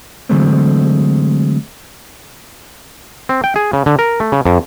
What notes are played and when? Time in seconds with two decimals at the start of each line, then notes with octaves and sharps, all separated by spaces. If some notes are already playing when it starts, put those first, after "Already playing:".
0.29 D3 E3 F#3 G#3 A3 C4
3.29 C4
3.44 G5
3.56 G#4
3.73 C#3
3.86 D3
3.99 A#4
4.20 A3
4.32 C#3
4.45 F2